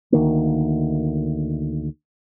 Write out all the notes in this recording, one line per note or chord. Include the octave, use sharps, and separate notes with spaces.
D2 D#3 A#3